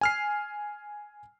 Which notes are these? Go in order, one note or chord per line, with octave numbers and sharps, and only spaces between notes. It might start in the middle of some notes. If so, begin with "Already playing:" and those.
G#5 F6 C7